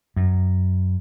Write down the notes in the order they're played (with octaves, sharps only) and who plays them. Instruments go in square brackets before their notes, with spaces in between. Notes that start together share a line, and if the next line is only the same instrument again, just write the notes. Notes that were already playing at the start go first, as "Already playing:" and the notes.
[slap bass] F#2